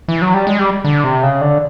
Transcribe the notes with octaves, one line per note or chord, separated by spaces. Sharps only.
E3
F#3
G3
G#3
G3
D3
C3
C#3
D3